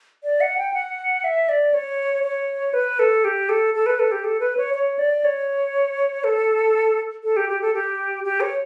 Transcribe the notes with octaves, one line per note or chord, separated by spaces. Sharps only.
D5
F#5
G5
F#5
E5
D5
C#5
C#5
B4
A4
G4
A4
A4
B4
A4
G4
A4
B4
C#5
C#5
D5
C#5
A4
A4
G4
G4
A4
G4
G4
C#5